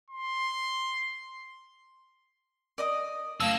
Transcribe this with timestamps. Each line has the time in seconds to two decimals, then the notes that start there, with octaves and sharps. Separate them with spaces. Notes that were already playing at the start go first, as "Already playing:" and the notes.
0.10 C6
2.78 D5 D#5 D#6
3.40 F#2 A3 A#3 F5 A5 E6